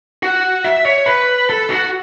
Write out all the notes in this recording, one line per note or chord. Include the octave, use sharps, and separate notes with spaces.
F#4
E5
C#5
B4
A4
F#4